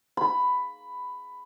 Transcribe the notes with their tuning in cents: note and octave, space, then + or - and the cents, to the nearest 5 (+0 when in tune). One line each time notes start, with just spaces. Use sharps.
B5 +10